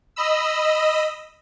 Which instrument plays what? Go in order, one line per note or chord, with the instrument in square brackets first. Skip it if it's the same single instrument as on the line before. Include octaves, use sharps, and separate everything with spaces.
[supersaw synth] D#5 B5 E6